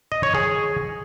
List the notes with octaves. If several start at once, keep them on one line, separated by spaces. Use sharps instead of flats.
D#5
C#5
G#4